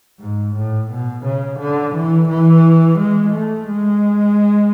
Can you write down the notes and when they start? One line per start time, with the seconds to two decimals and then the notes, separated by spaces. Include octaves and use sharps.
0.20 G#2
0.55 A2
0.91 B2
1.25 C#3
1.59 D3
1.95 E3
2.29 E3
2.98 G#3
3.33 A3
3.68 G#3